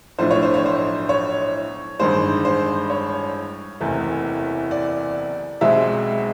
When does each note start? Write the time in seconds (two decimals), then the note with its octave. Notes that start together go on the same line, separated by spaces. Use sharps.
0.19 B1 A2 F3 A3 D4 C5
0.31 C#5
0.43 C5
0.54 C#5
0.66 C5
1.09 C#5
1.99 A1 G2 D#3 G#3 C5
2.45 C5
2.90 C#5
3.80 F#1 E2 C3 E3 A3
4.71 D5
5.61 B1 B2 G#3 C4 E5